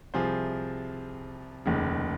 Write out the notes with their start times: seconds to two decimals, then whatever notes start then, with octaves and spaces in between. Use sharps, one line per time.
0.14 C2 C3 F3 G#4 C5
1.66 F1 D#2 C#3